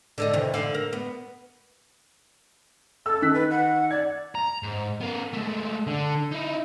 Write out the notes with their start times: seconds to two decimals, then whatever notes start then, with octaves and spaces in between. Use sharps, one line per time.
0.18 D3 A4 D#5
0.33 C3 D#3 E3
0.54 D3 F5
0.74 A#4
0.93 B3
3.06 A4 E6
3.22 D#3 F#6 B6
3.34 B4
3.51 F#5
3.91 D5 G#6
4.35 A#5
4.63 G#2
5.01 B3 A#4
5.34 G#3 A3
5.87 D3
6.31 D#4 E4